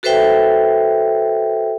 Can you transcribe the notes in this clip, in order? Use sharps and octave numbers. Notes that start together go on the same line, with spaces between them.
F#4 A4 B4 C5 E5 G5